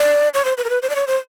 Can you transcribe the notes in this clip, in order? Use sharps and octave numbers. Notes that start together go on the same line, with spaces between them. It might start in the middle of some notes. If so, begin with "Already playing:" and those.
Already playing: D5
C#5
C5
B4
A#4
B4
C5
D5
C#5
C5